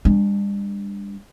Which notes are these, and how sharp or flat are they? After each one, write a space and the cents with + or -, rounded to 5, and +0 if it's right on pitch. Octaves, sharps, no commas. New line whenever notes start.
G3 +45 D4 +0